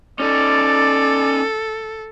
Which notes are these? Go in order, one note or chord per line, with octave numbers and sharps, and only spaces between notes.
C#4 D#4 A4 D5